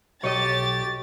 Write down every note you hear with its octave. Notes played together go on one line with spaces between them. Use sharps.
B1 G4 C#5 D#5 A6